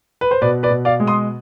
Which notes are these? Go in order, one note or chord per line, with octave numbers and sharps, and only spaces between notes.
B4
C5
B2 B4 D5
B4 D5
B2
D5 F5
G#3
C6 D#6